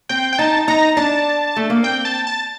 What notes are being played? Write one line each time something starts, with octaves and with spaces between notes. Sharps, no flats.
C4 G5
G5
D#4 A5
D#4 A#5
D4 A5
A3
A#3
C4 G5
A5
A5